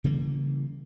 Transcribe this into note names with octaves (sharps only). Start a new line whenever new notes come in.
C#3 E3 G3 A#3